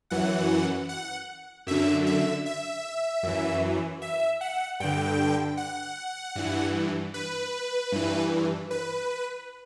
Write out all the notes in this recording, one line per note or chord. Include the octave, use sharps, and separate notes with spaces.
F#2 E3 F#5
F#5
F#2 D3 E5
E5
E5
F#2 E3
E5
F#5
G2 D3 G5
F#5
G2 E3
B4
G2 E3
B4